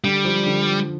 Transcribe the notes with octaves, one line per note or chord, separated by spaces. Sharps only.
D3 G3
F3
D3